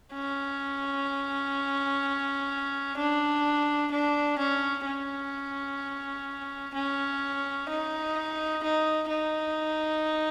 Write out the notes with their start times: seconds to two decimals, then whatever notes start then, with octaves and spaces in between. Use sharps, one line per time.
0.14 C#4
2.97 D4
3.91 D4
4.38 C#4
4.85 C#4
6.74 C#4
7.69 D#4
8.63 D#4
9.10 D#4